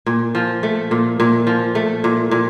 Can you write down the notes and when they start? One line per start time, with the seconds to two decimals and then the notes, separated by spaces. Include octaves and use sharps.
0.06 A#2
0.35 F3
0.63 A3
0.91 A#2
1.20 A#2
1.47 F3
1.75 A3
2.04 A#2
2.31 A#2